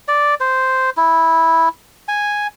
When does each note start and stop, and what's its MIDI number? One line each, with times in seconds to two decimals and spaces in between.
0.08 0.34 74
0.40 0.90 72
0.97 1.69 64
2.08 2.47 80